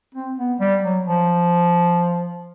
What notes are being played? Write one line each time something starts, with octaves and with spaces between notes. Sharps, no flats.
C4
B3
G3
F#3
F3